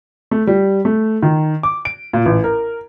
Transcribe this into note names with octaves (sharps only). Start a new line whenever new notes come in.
A3
G3
A3
D#3
D6
D7
A#2
A1
A#4